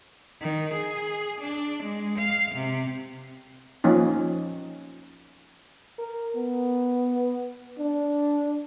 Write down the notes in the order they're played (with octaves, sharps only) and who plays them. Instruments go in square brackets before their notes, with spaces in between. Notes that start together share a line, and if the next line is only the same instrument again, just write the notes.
[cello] D#3
G#4
D4
G#3
F5
C3
[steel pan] F3 A#3 C#4 D#4
[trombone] A#4
B3
D4